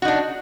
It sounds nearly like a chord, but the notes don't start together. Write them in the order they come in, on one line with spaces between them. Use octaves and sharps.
F#4 D#4 D4